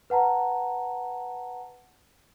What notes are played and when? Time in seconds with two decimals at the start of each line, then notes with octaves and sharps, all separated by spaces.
0.10 B4 F#5 A5 A#5